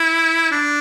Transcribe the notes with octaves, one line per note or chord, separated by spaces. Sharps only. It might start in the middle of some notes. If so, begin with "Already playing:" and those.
Already playing: E4
D4